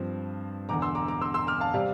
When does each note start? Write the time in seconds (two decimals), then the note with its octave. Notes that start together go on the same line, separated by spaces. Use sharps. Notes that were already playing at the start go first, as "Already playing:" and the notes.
Already playing: G2 F3 C4
0.69 E1 E2 D3 A#5 D6
0.82 C6 E6
0.95 A#5 D6
1.08 A#5 D6
1.21 C6 E6
1.34 C6 E6
1.47 D6 F6
1.60 F5 A5
1.74 C3 G3 C4 D5 F5